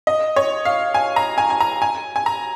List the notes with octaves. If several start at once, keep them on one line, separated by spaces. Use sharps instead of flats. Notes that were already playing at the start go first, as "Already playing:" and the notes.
D#5
C#5
F5
G#5
A#5
G#5
G#5
A#5
G#5
G#5
A#5